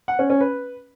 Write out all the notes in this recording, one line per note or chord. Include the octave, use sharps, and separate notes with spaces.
F#5
C#4
C#4
B4